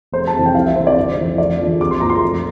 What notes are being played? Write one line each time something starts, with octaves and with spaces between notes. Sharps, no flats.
F1 C5
A5
F2 C3 E3
G5
C2 F5
E5
C3 E3 C5
D5
G1 C5
F2 E3
F1 D5
E2 D3 F3
C2 D6
C6
A#2 F3 A#5
C6
F1